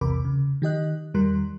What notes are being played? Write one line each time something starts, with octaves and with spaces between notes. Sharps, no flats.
B1 E2 C3 A#4 B5 D6
C#3
D#3 G4 D#5 F#6
E2 D#3 G3 A#4 C6 F#6